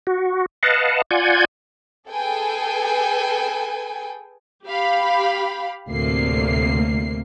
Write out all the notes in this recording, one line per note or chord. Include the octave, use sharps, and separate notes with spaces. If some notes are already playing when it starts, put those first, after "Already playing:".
F#4
B4 D#5 F5 F#5 A5
F4 D5 F#5 G#5 G6 G#6
G#4 A4 B4 G5 G#5
G4 F5 B5
D2 A2 C3 A#3 C7